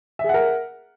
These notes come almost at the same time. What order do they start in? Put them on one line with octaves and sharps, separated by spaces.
E5 G#4 F#5 A#4